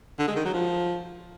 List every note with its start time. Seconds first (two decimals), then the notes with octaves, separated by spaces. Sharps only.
0.19 D3
0.27 G#3
0.36 D#3
0.45 F#3
0.54 F3